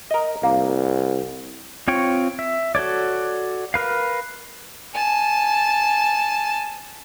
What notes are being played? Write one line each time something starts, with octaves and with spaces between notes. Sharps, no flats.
A#4 D#5
C2 A#3
C4 F4 C#5 G5 C#6
E5
F#4 A4 C#5 D5
A#4 B4 F5
G#5 A5